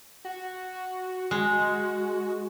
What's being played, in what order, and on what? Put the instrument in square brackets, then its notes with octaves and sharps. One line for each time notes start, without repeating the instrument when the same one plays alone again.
[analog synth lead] F#4
[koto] G#3